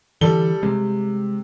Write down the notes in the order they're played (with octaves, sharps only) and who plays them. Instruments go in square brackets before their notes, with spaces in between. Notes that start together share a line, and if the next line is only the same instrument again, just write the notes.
[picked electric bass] D3 E3 [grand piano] G3 A4 G7
[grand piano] C3 [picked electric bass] G3 G#3